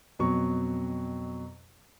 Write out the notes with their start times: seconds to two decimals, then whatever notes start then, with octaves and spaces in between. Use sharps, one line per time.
0.19 F2 B2 F#3 C#6